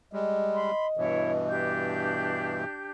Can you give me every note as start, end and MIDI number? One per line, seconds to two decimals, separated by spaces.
0.13 0.71 55
0.13 0.71 56
0.13 1.81 75
0.55 0.86 83
0.55 0.86 84
0.97 2.64 43
0.97 2.64 47
0.97 2.64 52
0.97 1.32 64
0.97 1.32 73
1.48 2.92 62
1.48 2.92 67
1.48 2.92 91